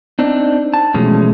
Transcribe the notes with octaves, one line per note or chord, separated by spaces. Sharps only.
C4 D4 D#4
A5
B2 E3 F3 G#3 A3 C#4